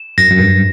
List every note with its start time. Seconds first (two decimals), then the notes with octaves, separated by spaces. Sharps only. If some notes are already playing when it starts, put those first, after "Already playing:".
Already playing: E7
0.18 F#2 A#6
0.31 F#2
0.40 G2